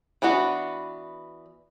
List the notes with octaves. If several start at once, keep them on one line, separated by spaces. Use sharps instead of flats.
E3 B3 D4 F#4